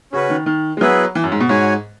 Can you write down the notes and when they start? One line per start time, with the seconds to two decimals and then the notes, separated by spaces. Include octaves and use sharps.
0.12 C#3 C#4 F#4 B4
0.30 D#3
0.46 D#3
0.77 G#3
0.81 F#3 B3 E4 G#4 B4
1.15 E3
1.24 F#2
1.32 G#2
1.40 B2
1.49 G#2 F#4 C#5 G#5